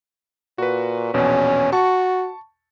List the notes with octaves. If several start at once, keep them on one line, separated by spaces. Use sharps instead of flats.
A#2 F#4 B4
A#1 E2 B2 C#4
F#4 A5 C#6